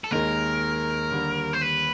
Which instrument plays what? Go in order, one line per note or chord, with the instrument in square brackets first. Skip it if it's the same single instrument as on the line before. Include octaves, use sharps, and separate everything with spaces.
[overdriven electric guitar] A4
[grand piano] D#2 D#3 G#3 [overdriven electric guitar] A#4
[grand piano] D#2 D3 G3
[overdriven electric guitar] C5
B4